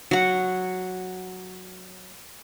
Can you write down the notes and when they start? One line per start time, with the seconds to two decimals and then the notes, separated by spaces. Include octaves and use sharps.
0.11 F#3 F#5